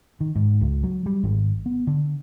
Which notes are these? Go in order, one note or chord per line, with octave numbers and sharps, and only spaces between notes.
D#3
G#2
C#2
F#3
G3
G#1
B3
D3